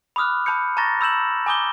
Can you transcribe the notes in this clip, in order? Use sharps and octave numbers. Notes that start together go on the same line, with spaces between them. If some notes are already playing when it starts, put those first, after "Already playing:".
B5 D6 D#6 F6 F#6
A5 B5 D#6 G6 C#7
A5 A#5 C#6 A6 A#6
B5 E6 G6 E7 F#7
G#5 A#5 D6 D#6 G6 G7